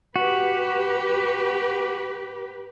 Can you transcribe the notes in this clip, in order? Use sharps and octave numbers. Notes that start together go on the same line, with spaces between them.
F#4 G4 B4